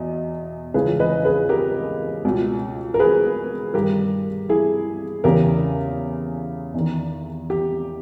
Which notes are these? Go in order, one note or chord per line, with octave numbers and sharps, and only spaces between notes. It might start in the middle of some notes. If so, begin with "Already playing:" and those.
Already playing: E2 B2 D#5
C#2 C#3 E3 G#4 B4
B4 D#5
G#4 B4
G4 A#4
C#2 B2
A#4
G#4 B4
G2 D#3 G4 A#4
E4 G#4
E2 C#3 E3 G4 A#4
E2 D#3
G4